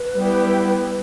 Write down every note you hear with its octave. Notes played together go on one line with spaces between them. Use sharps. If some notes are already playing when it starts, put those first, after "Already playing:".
Already playing: B4
G3 B3 E4 G4